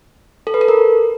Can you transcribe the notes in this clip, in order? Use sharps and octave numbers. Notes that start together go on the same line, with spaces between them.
A4
B4
A4
A#4